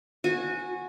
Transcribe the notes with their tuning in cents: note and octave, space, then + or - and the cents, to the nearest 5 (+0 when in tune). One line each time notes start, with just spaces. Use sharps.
F#4 -20 G#5 +0